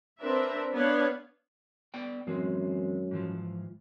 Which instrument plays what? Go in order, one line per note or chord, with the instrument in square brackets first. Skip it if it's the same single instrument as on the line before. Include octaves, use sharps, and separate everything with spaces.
[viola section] C4 D4 A#4 B4 E5
B3 D4 C#5 F5
[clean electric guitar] B3 D5 G5
[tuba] F#2 [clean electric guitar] E3 G#3 C4
[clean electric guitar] G#2 E3 F3